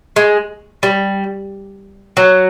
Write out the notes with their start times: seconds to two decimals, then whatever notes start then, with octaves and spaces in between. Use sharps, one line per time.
0.16 G#3
0.83 G3
2.17 F#3